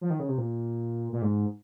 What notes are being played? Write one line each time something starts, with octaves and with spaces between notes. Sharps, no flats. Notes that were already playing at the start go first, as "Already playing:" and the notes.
F3
D#3
C#3
C3
A#2
A#2
G#2